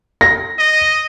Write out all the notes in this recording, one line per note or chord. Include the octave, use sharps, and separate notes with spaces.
A#6
D#5